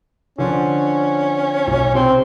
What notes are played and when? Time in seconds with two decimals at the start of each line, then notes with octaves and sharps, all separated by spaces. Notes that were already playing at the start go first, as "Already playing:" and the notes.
0.38 D3 F3 C#4 D4
1.67 B1
1.95 C3 C4